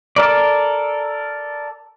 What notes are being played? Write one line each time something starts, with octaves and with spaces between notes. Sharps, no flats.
A4 A#4 D5